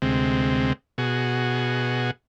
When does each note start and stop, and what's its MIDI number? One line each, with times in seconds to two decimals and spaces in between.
0.02 0.73 38
0.02 0.73 48
0.02 0.73 56
0.02 0.73 60
0.98 2.11 47
0.98 2.11 66
0.98 2.11 68